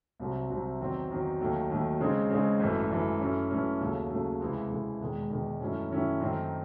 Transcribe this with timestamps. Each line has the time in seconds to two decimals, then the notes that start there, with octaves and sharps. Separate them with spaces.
0.20 C2 C3 F#3 C4
0.50 C2 C3 F#3 C4
0.80 E2 D#3 F#3 C4
1.10 E2 D#3 F#3 C4
1.40 D#2 D#3 F#3 A3
1.70 D#2 D#3 F#3 A3
2.00 C#3 G#3 C4 D#4 G#4
2.30 C#3 G#3 C4 D#4 G#4
2.60 G#1 F#2 E3 A3
2.90 G#1 F#2 E3 A3
3.20 F#2 E3 A3 C#4
3.51 F#2 E3 A3 C#4
3.80 D#2 C#3 F#3 A3
4.10 D#2 C#3 F#3 A3
4.40 C#2 C3 E3 G#3
4.70 C#2 C3 E3 G#3
5.00 E1 E2 D#3 G#3
5.31 E1 E2 D#3 G#3
5.60 F#2 D#3 A3 C#4 E4
5.91 F#2 D#3 A3 C#4 E4
6.21 F#2 D#3 A3 C4